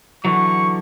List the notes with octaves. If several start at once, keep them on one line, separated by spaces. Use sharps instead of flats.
D3 E3 F#3 C#6